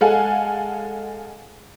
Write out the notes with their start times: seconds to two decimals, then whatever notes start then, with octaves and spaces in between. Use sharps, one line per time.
0.01 G#3 A4 F5 F#5 G#5